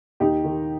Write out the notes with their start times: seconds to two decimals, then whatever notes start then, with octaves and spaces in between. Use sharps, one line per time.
0.20 D#2 D#4 G4
0.44 D#3